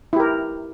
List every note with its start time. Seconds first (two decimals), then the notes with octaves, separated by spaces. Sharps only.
0.13 E4
0.16 G4
0.20 A#4